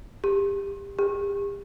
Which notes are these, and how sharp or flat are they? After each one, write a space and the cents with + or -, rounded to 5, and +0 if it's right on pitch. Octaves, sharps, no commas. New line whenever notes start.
G4 +25
G4 +40